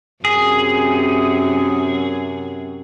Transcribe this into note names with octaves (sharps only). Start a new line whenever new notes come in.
F#2 C3 G#4